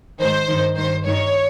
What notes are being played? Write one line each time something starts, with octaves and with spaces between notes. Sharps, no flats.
G#2 D#3 C5
G2 D#3
G2 D#3 C5
G2 D#3 C#5